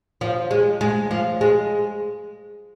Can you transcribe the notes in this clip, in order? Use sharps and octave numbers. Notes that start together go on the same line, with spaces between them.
F3
G#3
G#3
F3
G#3